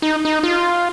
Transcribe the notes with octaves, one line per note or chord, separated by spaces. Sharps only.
D#4
D#4
F4